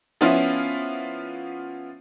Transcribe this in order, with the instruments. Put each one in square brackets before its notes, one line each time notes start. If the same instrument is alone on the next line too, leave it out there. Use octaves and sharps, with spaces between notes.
[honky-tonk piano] F3 B3 C#4 E4 F4